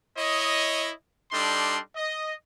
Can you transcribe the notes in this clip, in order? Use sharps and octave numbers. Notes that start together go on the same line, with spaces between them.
E4 C#5 D#5
G3 D4 D#4 A4 C6
D#5